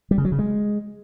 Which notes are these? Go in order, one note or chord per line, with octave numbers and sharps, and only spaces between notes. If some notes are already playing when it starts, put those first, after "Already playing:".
G3
C#3
F#3
C#3
G#3